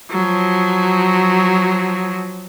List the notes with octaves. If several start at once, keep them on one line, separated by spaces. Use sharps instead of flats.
F3 F#3